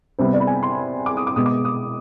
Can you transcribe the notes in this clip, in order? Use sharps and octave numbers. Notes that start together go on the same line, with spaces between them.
C3 G3 B3 C5
D5
B5
G#5
C6
D6
D#6
D6
B2 G#3 B3 D#6
D6
D#6